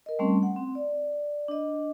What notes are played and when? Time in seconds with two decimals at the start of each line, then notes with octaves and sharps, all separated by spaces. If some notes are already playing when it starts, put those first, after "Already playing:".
0.06 A#4 D#5
0.19 G3 A3 C4 C#4
0.43 F#5
0.56 C4
0.75 D5
1.48 D4 D#5